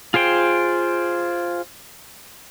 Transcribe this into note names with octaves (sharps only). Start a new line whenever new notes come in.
F4 G#4 C5 G5